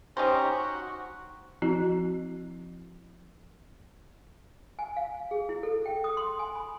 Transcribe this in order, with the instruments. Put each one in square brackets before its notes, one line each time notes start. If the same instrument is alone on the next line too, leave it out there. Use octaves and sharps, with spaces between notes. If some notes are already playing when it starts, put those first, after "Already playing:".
[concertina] C#4 G4 A#5 [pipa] D#4 C5
[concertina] F#4 F#5
F#4
[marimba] F3 C4 E4 F#4
[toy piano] G#5
F5
G#4
E4
A4
G5
D#6
C6
G#5
B5